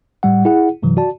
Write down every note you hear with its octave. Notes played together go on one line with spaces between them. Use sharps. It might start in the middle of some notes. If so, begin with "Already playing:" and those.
A2 G3 F#5
E4 G#4 F#5
G2 C3 E3 F#3
F#4 D5 A5